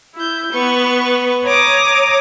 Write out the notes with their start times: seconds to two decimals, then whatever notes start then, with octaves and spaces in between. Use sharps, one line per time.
0.13 E4 G6
0.51 B3 B4 C#6
1.44 C#5 A#5 D6 D#6